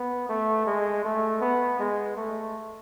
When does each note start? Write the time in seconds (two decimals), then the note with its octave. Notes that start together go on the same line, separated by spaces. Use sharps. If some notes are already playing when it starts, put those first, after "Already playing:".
Already playing: B3
0.29 A3
0.66 G#3
1.04 A3
1.41 B3
1.79 G#3
2.17 A3